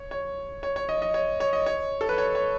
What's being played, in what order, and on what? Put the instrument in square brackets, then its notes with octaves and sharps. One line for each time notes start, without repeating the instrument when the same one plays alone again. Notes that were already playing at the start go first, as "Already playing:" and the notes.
Already playing: [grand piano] C#5
C#5
C#5
C#5
D#5
D#5
C#5
C#5
D#5
C#5
A4
B4
C#5
C#5